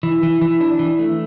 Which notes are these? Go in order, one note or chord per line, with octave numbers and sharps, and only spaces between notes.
E3
E3
E3
D4
E3
A3